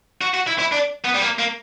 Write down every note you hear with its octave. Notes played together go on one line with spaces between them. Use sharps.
F#4
F#4
E4
E4
D4
B3
G3
A#3
A#3